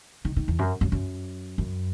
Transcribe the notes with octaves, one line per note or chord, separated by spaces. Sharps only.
D#3
D#3
E2
F#2
F#2
F#2
F#2